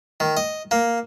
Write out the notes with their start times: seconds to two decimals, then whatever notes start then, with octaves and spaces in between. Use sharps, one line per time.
0.20 D#3
0.37 D#5
0.71 A#3